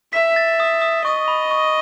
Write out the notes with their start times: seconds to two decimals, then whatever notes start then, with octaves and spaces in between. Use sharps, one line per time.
0.13 E5 B6
0.36 A6
0.60 D#6
0.82 D#6
1.05 D#5 C#6
1.28 B5
1.51 C#6